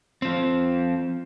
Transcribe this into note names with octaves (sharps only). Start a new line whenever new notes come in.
F3 C4